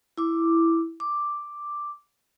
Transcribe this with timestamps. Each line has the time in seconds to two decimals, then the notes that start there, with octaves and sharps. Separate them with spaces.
0.18 E4 D6
1.00 D6